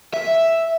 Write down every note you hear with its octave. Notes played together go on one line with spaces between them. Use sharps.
E5